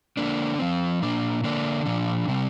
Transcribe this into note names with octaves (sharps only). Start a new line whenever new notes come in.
D3 A#3 D4
F3 C4
A#2 A#3 D4
D3 A#3 D4
A#2 F3 D4
C3 G3 C4